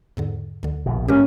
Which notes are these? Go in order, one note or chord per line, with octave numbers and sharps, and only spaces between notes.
E2 G#2 D3
D2 D3
A#1 B2
G#2 E3 A#3 C#4 G4 A#4